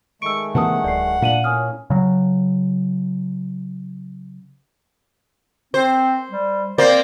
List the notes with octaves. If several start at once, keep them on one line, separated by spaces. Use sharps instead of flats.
D#3 G#3 A3 C#6 E6 D7
C3 E3 A#3 B4 F#5 A5 D#6
D1 D5 C7
A#2 D4 F5 D#7 F#7
A2 A#3 C#4 G#5 D#6 F6
C#3 F#3
C4 C5
G3
A#3 C4 C5 D5